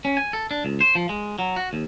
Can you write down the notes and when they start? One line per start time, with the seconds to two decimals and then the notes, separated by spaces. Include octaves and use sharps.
0.05 C#4
0.17 G#5
0.33 A4
0.51 D4
0.65 C#2
0.81 C5
0.95 F3
1.09 G#3
1.39 F#3
1.56 F#4
1.73 D#2